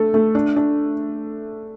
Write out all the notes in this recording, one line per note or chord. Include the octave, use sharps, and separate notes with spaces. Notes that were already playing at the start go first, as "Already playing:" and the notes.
Already playing: A3 D4 A4
A3
D4
D4